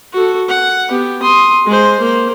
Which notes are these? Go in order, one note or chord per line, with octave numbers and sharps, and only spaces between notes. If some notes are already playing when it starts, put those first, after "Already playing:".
F#4 A4
F#5
B3 G4
C6 D#6
G#3 C5
A#3 C5